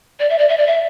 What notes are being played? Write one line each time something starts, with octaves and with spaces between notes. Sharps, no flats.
D5
E5
D5
E5
D5
E5